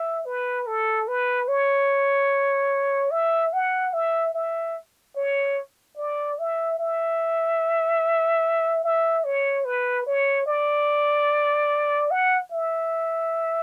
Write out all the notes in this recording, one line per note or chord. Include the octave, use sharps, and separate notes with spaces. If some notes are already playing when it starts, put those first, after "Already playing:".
Already playing: E5
B4
A4
B4
C#5
E5
F#5
E5
E5
C#5
D5
E5
E5
E5
C#5
B4
C#5
D5
F#5
E5